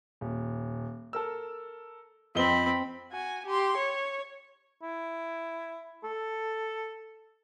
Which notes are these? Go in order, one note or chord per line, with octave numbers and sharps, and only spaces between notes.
D#1
A4 A#4 E6
F2 C4 D#5 B5 G7
F#4 G#5
G4 C6
C#5
E4
A4